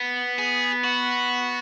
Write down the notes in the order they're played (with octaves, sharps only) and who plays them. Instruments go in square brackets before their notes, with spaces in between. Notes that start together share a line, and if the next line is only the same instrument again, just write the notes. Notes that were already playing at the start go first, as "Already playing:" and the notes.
Already playing: [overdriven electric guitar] B3
[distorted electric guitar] G#4
F#4